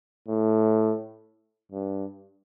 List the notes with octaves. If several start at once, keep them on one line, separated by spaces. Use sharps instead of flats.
A2
G2